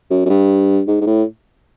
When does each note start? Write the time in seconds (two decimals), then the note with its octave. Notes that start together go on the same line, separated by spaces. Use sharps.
0.10 F#2
0.26 F#2
0.29 G2
0.88 G#2
1.01 G#2
1.07 A2